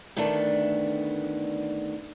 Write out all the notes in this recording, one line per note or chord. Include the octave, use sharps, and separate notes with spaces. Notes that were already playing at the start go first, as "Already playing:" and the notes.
D2 D#3 A3 B3 D4